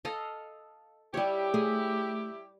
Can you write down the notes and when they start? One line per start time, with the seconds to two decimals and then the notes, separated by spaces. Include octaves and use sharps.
0.05 A4 D#5 F5
1.14 G3 E4 G4 C#5
1.54 A3 G#4